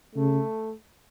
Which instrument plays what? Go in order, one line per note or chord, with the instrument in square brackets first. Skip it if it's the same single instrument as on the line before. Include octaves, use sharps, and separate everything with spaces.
[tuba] C#3 [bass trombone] A3